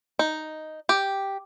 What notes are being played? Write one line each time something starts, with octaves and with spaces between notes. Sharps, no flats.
D#4
G4